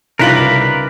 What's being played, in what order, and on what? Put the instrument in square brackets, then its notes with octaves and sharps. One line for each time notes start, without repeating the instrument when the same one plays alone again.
[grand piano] C2 F#7 [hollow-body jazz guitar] C#3 D#4 F4 [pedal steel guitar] A#4 B4 D5